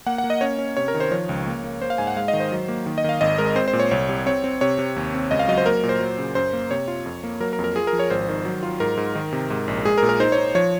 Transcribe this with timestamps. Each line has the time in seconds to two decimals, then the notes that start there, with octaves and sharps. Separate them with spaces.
0.06 A#3 F#5
0.18 F#5
0.24 A#3
0.30 D#5
0.41 C#4 C#5
0.59 C#4
0.77 C3 C#5
0.88 A#4
0.95 D#3
1.00 C5
1.11 F3 C#5
1.29 C#2
1.47 A#3
1.64 A#3
1.81 A#3 C5
1.90 F5
1.98 G#2 G#5
2.07 F#5
2.16 G#3 F5
2.28 D#5
2.33 D#3
2.40 C5
2.52 F#3
2.68 A#3
2.86 D#3
2.98 D#5
3.04 D#3 F5
3.21 G#1 D#5
3.38 G#3 A#4
3.56 C4 C5
3.68 C5
3.73 A#2
3.80 C#5
3.91 C2 C#5
4.09 C3
4.26 C4 C#5
4.44 C4
4.61 C3 C#5
4.79 C3
4.96 D#2
5.14 C4
5.31 C#2 D#5
5.39 F5
5.48 F#3 D#5
5.58 C5
5.66 A#3 A#4
5.83 A#2
5.89 C5
6.00 F#3
6.18 C#3
6.35 F#2 C5
6.53 A#3
6.71 C3 C#5
6.88 F4
7.06 F2
7.23 A#3
7.40 F#3 A#4
7.53 A#4
7.59 F2
7.64 A#4
7.76 F4 G#4
7.87 A#4
7.93 F3
7.99 C#5
8.10 G#1 C5
8.29 D#3
8.45 F#3
8.63 F4
8.80 G#2 A#4
8.97 G#2
9.15 D#3
9.33 C3
9.50 G#2
9.68 A#1
9.85 G#3 G#4
9.98 A#4
10.03 A#2
10.09 A#4
10.20 D#4 C5
10.32 C#5
10.38 D#4
10.55 F3 C#5